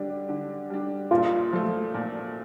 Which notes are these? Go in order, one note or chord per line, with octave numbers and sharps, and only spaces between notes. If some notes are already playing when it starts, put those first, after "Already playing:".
Already playing: D3 G3 D4
D3
G3 D4
A#2 F4
F3 A3
A#2